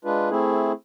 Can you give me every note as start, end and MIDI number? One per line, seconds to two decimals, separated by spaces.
0.05 0.29 56
0.05 0.29 62
0.05 0.29 65
0.05 0.29 71
0.30 0.72 57
0.30 0.72 60
0.30 0.72 64
0.30 0.72 68